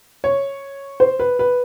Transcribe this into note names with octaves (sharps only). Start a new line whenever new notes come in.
C#5
C5
B4
B4